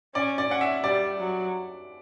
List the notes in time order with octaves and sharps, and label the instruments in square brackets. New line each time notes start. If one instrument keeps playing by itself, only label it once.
[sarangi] C#4 [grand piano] D5
[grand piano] D5
[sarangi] C#4 [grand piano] F#5
[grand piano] E5
[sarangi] G3 [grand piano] D5
[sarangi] F#3